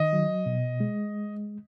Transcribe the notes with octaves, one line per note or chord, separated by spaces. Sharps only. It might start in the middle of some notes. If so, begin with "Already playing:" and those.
Already playing: D#3 D#5
F#3
B2
G#3